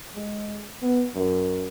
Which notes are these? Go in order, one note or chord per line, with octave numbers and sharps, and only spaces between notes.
G#3
B3
F#2